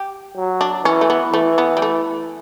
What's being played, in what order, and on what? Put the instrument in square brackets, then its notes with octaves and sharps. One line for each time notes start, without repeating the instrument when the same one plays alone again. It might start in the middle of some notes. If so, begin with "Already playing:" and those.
Already playing: [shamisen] G4
[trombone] F#3
[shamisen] D4
[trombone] E3 [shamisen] C#4
[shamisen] A3
B3
[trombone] E3 [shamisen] A3
[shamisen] B3
G3
A3